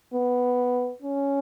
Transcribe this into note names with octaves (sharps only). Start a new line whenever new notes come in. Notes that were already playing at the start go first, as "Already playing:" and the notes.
B3
C#4